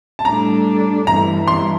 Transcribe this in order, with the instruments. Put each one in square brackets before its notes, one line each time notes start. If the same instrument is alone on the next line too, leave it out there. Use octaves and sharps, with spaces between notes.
[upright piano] A5
[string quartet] A2 G3 D4 A4 [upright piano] A#5
[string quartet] G2 E3 G3 [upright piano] A#5
[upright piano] C6